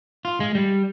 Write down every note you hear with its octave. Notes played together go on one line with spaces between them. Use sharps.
F4
G#3
G3